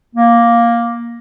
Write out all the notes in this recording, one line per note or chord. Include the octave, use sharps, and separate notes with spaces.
A#3